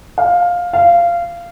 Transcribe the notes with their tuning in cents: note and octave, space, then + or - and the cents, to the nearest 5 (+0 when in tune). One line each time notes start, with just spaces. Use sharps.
F5 +10
F5 -20